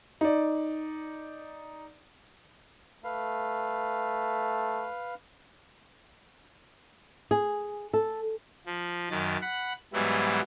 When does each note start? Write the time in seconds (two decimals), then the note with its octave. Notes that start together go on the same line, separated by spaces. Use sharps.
0.21 D#4 D5
3.04 A3 B4 F5
7.31 G#4
7.93 A4
8.66 F3
9.10 F#2 D#3 A6
9.42 F#5 B5
9.93 G#2 E3 F#3 G3 B3 E4